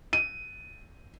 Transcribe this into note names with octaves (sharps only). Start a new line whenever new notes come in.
D#7